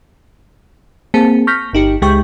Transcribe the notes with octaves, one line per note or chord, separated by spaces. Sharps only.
A#3 C4 G#4 A5
C#6 F6 G6 A#6 B6
G1 D#4 G4 C#7
C#2 G#3 G4 G5 C#6 G6